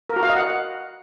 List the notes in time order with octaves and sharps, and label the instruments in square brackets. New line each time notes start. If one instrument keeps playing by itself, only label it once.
[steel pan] A#4
F#4
F5
D#5
F#5